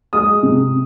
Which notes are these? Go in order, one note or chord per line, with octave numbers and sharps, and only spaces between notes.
G#3 D#6
C3